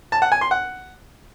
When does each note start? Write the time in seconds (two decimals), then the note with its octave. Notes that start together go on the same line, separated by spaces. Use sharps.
0.12 A5
0.22 F#5
0.32 G#5
0.41 C6
0.51 F#5